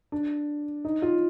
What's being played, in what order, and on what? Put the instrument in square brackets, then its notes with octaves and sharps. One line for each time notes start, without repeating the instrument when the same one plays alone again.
[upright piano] D4
D#4
F4